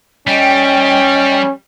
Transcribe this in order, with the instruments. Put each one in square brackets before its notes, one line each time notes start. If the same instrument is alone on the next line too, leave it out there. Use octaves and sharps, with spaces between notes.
[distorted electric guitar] G3 [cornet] C#4 [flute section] D#5 G5